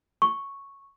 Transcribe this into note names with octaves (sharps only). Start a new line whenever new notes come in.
C#6